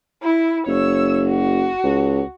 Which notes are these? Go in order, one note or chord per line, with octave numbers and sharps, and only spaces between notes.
E4
F#1 C#5 E6
F#4
C#2